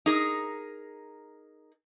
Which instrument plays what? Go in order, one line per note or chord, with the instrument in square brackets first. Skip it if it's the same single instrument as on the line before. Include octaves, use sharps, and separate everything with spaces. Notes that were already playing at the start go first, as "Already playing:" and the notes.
[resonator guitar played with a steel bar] D#4 G#4 A#4